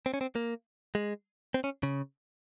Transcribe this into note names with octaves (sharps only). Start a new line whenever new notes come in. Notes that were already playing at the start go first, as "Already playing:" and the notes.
C4
C#4
C4
A#3
G#3
C4
C#4
C#3